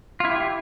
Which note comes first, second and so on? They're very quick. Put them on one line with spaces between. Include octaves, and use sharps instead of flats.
F4 E4 G4